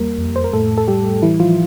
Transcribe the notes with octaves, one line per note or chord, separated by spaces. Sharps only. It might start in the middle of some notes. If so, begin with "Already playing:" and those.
Already playing: E2 G3 A#3 A#4
F2
C5
A#4
A2 A3 A4
A4
A2 G3 G4
E3 G3 E4
F3 F4